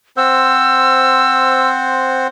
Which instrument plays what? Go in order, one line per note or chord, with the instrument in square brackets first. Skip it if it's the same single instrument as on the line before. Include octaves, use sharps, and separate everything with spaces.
[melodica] C4 C5 F#5 [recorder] E6